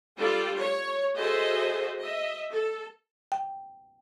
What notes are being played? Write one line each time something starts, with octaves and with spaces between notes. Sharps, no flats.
G3 D4 F4 A4 D5
C#5
F#4 G#4 A4 C5 D#5 E5
D#5 E5
A4
G5